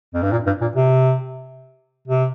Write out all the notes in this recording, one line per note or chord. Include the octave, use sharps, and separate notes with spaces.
F2
G2
A#2
G2
A#2
C3
C3